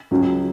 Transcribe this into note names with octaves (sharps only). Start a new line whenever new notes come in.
C#2 C#3 F#3